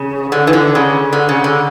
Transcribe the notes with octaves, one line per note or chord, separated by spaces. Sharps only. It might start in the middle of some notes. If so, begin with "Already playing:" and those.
Already playing: C#3
D3
E3
D3
C#3
D3
C#3
D3